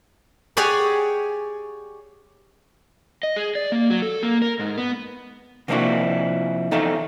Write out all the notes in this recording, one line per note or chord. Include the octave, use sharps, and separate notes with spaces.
G4 G#4 C#5 D5 F#5 G#5
D#5
G#4
D5
A#3
F#3
A4
A#3
A#4
G#2
B3
C3 F3 A#3 D4 E4 F#4
E2 D#4 A4 E5 F5